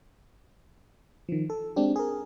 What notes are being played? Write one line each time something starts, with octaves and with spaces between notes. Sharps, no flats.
D#3 F3
A4
G#3 C4 D4 G4
G#4 A#4